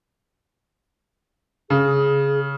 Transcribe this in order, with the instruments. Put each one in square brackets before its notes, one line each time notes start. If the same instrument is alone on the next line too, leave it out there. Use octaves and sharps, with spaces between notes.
[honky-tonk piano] C#3 [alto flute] G#4